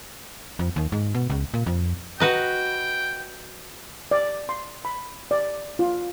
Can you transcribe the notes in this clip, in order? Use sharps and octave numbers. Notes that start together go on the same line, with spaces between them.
F2
D#2
G#2
B2
C#2
A#2
F2
F#4 B4 D#5 G5
D5
C6
B5
D5
F4